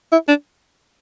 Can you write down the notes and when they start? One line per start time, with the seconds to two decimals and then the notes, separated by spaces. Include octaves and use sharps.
0.12 E4
0.28 D4